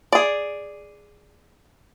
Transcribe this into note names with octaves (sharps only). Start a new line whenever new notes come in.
G#4 D5